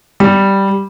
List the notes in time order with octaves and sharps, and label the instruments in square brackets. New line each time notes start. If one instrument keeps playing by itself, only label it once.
[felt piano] G3